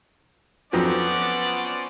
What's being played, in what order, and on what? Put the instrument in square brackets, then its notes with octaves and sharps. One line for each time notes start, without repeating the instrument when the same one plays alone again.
[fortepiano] F2 F3 F#3 [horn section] B3 [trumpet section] C#4 C5 D5